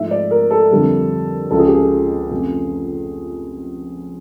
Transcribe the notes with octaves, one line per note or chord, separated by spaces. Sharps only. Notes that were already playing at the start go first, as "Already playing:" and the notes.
Already playing: G#2 F3 A3 E5
D5
A#4
A4
F2 D3 G3
C#2 C#3 F3 A4
G#4
G4
G#4
F2 C#3 F3 A3